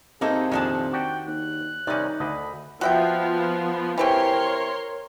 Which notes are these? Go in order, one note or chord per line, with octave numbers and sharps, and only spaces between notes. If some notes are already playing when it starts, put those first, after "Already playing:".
C3 A3 A#3 D#4 G#4 A4
F2 A#2 D#3 D4 A5
F#4 G4 D5 G5
D#2 F#6
C3 D#3 G3 C#4 D#4 D5
D2 D3 D#5 B5
F3 B3 F#4 E5 G5
E3 C4 G4 A#4 C#5 C6